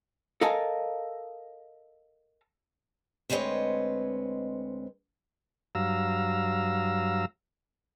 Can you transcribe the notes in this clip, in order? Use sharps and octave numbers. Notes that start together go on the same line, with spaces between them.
A4 A#4 D#5 F5 G#5 A5
D2 G#3 C4 B4 C#5 D#5
G2 F#3 F5 A#5 E6